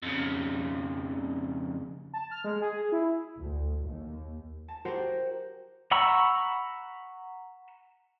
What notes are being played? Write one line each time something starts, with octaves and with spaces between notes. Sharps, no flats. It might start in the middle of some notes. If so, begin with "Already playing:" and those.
F2 C#3
A5
F6
G#3
G#4
E4
D2
D#2
A5
F#4 G4 A#4 C5 F#5 G5
F#5 A#5 B5 C#6 E6